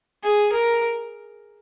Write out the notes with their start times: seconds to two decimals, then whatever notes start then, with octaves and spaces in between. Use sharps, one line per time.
0.23 G#4
0.53 A#4